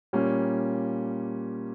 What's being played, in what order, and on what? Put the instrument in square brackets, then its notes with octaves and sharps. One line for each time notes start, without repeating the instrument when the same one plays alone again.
[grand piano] A#2 G3 A#3 C#4